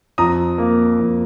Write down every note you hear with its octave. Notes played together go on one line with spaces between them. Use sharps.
F2 A#5 D#6
A#3
F2